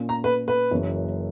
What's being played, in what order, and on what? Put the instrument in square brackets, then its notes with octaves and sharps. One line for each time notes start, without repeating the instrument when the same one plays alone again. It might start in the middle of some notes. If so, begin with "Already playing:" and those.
Already playing: [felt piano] A#2 A#3 C#4
[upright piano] A#5
B4
B4
[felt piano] F#1 F#2 E3